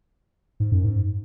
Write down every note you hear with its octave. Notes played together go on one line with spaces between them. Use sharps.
G#2
F#2
G#2